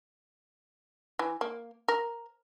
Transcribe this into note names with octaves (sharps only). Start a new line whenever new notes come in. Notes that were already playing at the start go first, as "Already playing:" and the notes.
E3
A#3
A#4